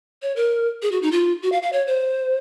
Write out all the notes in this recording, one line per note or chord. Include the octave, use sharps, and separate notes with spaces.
C#5
A#4
G#4
F#4
D#4
F4
F#4
F5
F5
C#5
C5